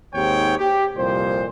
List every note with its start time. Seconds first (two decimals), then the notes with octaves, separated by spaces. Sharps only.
0.15 D#2 G#2 C4 G4 C#5 G5
0.59 G4
0.96 C2 F2 A#2 C5